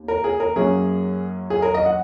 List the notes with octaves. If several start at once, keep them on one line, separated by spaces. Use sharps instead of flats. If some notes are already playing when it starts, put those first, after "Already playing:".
Already playing: D#2
A#4
G#4
A#4
F#2 F#3 A#3 C#4 G#4
G#4
A#4
D#5
F#5